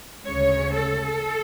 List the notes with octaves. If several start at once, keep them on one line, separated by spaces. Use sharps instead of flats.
D2 C#3 G#3 C#5
A4